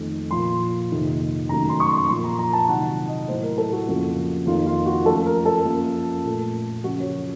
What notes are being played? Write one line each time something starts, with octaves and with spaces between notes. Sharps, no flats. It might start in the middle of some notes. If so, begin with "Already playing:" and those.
Already playing: F2 D#3 A3
A#2 F3 A#3 C6
F2 C3 D#3 A#3
F#2 D#3 F#3 A3 A#5
C6
C#6
C6
A#2 F3 A#3 C6
A#5
A#5
A5
C3 D#3 F#3 F#5
D#5
A2 F#3 A3 C5
A#4
A4
F#4
F2 C#3 F3 A#3
F2 D#3 A#3 F4
F4
F#4
F#2 F3 A3 A4
A#4
A4
F#2 F3 A#3
A#2 A3
F#2 C#3 F3 F#4
C#5